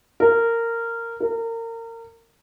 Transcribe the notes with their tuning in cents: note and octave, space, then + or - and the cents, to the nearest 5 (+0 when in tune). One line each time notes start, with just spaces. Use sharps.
A#4 -15
A#4 -30